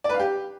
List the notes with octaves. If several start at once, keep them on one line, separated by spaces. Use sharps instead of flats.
D5
B4
F5
G4